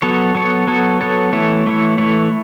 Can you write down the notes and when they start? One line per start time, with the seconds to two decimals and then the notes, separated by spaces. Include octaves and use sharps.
0.02 F#3 B3 A4 C#5
0.35 F#3 B3 A4 C#5
0.67 F#3 B3 A4 C#5
1.01 F#3 B3 A4 C#5
1.33 E3 A3 E4 C#5
1.66 E3 A3 E4 C#5
1.98 E3 A3 E4 C#5